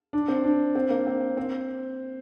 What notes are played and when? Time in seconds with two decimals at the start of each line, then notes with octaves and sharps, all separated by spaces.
0.13 D4
0.28 C4
0.44 D4
0.75 C4
0.90 A#3
1.07 C4
1.37 C4